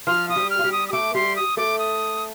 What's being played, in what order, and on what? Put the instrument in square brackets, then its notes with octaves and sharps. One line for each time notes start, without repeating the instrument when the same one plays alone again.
[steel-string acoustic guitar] F3 F4 [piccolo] F6
[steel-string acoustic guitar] F4 [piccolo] D#6
[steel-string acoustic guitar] G3 G4
[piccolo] F6
[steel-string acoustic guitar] F4
G3 G4
[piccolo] D#6
D#6
[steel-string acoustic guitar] A3 A4 [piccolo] D6
[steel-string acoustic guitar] G3 G4 [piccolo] C6
[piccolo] D#6
[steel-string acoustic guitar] A3 A4 [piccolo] D6
[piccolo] D#6